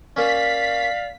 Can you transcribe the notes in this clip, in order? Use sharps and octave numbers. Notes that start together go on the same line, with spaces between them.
A#3 C#4 D5 F5 B6